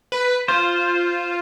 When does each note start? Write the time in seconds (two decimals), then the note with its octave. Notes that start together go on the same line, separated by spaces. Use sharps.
0.12 B4
0.48 F4 C5